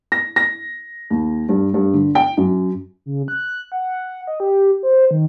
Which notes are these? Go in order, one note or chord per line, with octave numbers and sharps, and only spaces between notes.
A#6
A#6
D#2
G2
G2
D3
G5
F#2
C#3
F#6
F#5
D#5
G4
C5
D#3